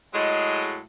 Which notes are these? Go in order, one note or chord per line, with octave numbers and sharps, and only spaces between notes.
A2 F#3 G#3